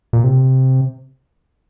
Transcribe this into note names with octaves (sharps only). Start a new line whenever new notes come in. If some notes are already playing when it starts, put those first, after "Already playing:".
A#2
C3